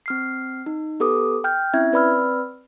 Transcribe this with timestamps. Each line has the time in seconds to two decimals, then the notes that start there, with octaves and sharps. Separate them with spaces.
0.06 C4 F6 C7
0.66 D#4
1.00 B3 G4 A4 B4 D6 D#6
1.44 G5 F6 G6
1.74 C4 C#4 E4 E5 G#6
1.92 C4 B4 D5 B5 E6 F6